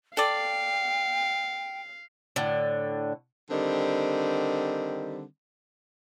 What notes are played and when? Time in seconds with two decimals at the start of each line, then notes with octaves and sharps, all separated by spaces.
0.17 A4 D5 F5 G5
2.36 A2 D3
3.51 D3 D#3 G3 C4